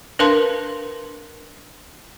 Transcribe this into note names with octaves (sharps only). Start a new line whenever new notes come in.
D4 A#4 B4 F5 A5 C6